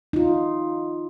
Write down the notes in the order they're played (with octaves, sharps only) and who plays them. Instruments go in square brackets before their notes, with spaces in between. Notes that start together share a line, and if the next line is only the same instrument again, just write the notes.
[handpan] D#4 F4